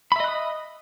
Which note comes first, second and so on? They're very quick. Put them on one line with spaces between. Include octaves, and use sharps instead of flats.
B5 E5 D#5 F#6 D#6